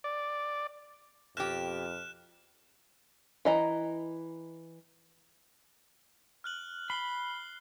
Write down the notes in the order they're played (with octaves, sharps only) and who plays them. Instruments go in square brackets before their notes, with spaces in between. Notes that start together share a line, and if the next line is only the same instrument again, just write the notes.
[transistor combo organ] D5
[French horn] F2 [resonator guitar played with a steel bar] B2 G4 [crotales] F6 F#6 E7
[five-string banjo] E3 D#5 A#5
[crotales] F6 F#6 F#7
[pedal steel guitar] B5 [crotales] C7 G7